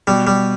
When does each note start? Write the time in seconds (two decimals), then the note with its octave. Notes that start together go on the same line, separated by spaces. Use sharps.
0.07 B2 G3
0.27 G3